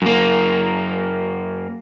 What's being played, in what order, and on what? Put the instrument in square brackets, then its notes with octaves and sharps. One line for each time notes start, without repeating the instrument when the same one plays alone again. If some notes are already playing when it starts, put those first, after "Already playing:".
[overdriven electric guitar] F#2 A#3